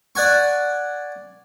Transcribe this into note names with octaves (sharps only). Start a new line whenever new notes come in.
D5 F#5 G#5 C#6